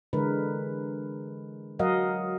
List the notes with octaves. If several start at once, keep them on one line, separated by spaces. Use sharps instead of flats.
D3 E3 G#3 A#4 B4
F#3 A#4 D#5 F5 F#5